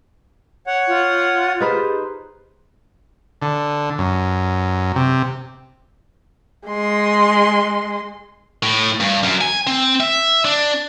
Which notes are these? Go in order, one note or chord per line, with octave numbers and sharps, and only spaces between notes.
C#5 F#5
F4
D#4 G4 G#4 B4 C5
D3
F#2
C3
G#3 C6
A2
G2
F#2
G#5
C4
E5
D4